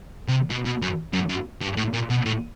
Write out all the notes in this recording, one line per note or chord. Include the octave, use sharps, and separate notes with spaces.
C3
B2
B2
F#2
F#2
F#2
G2
A2
A#2
B2
A2